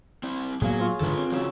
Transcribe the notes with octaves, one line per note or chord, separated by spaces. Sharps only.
C4 E4
A2 F#3 A#3 B3 G#4 F5
F4 C#5
G#2 D3 D#3 A4 B4
C4
C#3 F3 F#3 E6